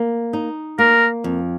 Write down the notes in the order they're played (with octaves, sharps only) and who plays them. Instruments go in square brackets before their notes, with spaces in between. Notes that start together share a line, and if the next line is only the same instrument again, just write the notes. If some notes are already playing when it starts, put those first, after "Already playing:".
Already playing: [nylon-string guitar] A#3
D#4
[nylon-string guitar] A#3 [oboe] A#4
[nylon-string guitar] F2